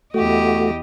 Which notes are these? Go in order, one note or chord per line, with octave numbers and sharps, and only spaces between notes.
E2 A3 F#4 G4 D#5